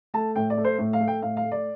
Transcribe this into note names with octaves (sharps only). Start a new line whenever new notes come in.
A3 A5
A2 G5
D5
A3
C5
A2
F5
A3
G5
A2 F5
F5
A3
D5